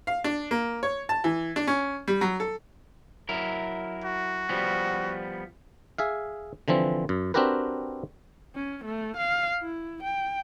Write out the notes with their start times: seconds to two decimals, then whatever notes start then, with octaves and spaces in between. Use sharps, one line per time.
0.07 F5
0.24 D4
0.51 A#3
0.83 C#5
1.09 A5
1.24 E3
1.56 D4
1.67 C#4
2.08 G3
2.21 F#3
2.40 A4
3.29 F#3 E4 A#4
4.04 F#4
4.49 F3 G3 B3
5.98 G#4 E5 F5
6.68 D3 E3 F3 C4
7.09 F#2
7.34 C4 D4 F#4 G4 A#4 B4
8.55 C#4
8.85 A3
9.17 F5
9.61 E4
10.03 G5